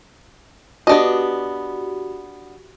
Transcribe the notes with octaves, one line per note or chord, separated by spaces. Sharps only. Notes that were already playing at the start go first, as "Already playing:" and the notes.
B3 D4 F#4 G4 D#5